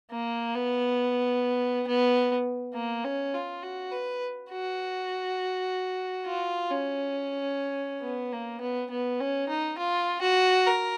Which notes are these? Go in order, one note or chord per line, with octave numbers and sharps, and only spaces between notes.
A#3
B3
B3
A#3
C#4
F4
F#4
B4
F#4
F4
C#4
B3
A#3
B3
B3
C#4
D#4
F4
F#4
A#4